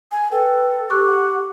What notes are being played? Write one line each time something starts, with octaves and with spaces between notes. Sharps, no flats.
G#5
A4 B4 G5
G4 C#6 D6 F#6
F#5